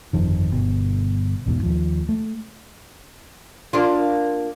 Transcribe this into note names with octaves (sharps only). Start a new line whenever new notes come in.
G1 F2 D#3
G1 B2
A1 E2 G#2 B2
D#2 F3
A3
A#3 D4 F4